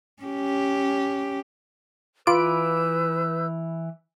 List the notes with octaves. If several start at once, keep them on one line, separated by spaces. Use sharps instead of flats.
C#4 G4
E3 F4 B4 B5 D6 E6 G6 D7